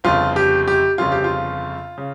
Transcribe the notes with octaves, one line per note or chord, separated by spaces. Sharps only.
G1 F2 C#3 F4
G4
G4
G1 F2 C#3 F4
G4
F4
C#3